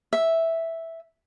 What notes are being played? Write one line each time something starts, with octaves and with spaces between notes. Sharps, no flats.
E5